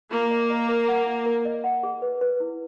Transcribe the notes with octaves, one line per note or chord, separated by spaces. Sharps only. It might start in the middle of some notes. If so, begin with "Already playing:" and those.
A#3 F4
D#5
D#5
A#4
F#5
F4
A#4
D#5
F#5
G#4
B4
B4
E4